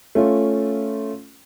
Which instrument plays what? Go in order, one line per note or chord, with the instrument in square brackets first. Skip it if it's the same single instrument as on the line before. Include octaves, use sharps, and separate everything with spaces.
[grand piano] A3 C#4 F4